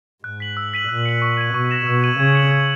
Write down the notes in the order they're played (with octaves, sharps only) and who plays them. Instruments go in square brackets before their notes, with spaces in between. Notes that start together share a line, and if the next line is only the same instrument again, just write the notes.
[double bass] G#2 [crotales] F#6
[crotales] B6 F#7
E6
B6 D#7 F#7
[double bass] A#2 [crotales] F#6
[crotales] C#7 F#7
C#6
G#6 D#7
[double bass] B2 [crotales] C#6
[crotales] F#6 A#6 E7
[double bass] B2 [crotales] E6
[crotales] G#6 D#7 F#7
[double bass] C#3 [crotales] G#6
[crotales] C#7 F#7
G#6